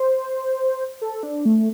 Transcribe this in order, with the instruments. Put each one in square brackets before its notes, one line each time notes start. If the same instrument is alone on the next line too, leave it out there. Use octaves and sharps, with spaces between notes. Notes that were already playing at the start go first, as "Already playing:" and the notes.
Already playing: [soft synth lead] C5
A4
D4
A3